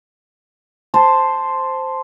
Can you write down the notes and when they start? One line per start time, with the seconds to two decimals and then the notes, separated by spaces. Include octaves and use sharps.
0.94 C5 A5